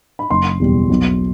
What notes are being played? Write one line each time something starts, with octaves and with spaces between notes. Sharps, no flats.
B5
F#1 C6
E2 B2 G3
B1